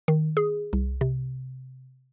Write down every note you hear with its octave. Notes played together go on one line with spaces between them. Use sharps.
D#3
G#4
C2
C3